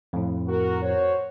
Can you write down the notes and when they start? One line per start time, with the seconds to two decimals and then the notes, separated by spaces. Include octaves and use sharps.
0.13 F2 A2
0.48 F#4 A#4
0.82 F#4 C5 C#5